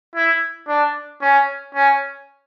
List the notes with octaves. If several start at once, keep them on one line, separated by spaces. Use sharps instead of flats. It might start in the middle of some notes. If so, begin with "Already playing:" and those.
E4
D4
C#4
C#4